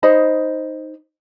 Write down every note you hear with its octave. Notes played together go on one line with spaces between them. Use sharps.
D#4 C5 D#5 B5